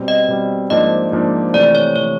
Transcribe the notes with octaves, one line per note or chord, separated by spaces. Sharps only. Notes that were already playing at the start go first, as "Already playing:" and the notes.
Already playing: B2 G3 C4
D#5
B2 G3 C4
G#2 F3 A#3 D4 D#5
G#2 F3 A#3 D4
C3 E3 A3 D5
C#5
C3 E3 A3 C#5